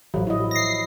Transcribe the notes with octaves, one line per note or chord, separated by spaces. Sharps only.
A1 F3 F#3
E4 D#5
A#6 C7